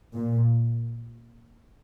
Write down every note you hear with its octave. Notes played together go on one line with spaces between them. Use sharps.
A#2